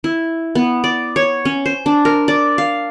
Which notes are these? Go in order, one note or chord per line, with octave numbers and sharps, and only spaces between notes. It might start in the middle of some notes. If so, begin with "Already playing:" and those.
E4
B3
D5
C#5
C#4
C5
D4
A#4
D5
F5